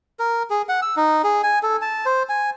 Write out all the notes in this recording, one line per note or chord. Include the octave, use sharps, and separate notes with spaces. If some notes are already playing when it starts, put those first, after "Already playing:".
A#4
G#4
F#5
E6
D#4
G#4
G#5
A4
A5
C5
G#5